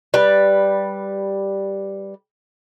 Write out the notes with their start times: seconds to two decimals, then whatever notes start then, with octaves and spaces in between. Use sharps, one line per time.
0.14 G3 B4